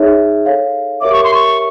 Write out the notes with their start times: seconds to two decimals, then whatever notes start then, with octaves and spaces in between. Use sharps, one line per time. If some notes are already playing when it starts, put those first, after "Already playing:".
Already playing: D#4 G#4 C#5 E5
0.46 A4 C#5 F5
1.01 G4 A#4 C#5 E5 D6
1.12 C#6
1.24 C6
1.34 C#6